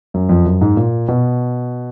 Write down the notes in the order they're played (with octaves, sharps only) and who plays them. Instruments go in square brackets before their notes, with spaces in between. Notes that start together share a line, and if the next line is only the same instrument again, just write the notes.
[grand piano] F#2
F2
F#2
G#2
A#2
B2